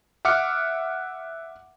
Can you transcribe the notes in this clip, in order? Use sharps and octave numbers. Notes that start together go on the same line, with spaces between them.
E5 F#5 D6 F6 C#7